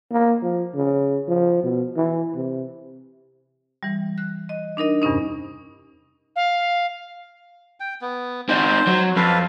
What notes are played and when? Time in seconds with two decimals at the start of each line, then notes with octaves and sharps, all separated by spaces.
0.12 A#3
0.42 F3
0.75 C#3
1.28 F3
1.63 B2
1.97 E3
2.36 C3
3.83 E3 G3
4.18 F#6
4.49 D#5
4.77 D4 D#4 A#4 D#5
5.02 E2 G2 C3 C#4 D#4
6.36 F5
7.80 G5
8.01 B3
8.49 C4 D#4 C5
8.87 F#3
9.16 F2 A4 B4 F5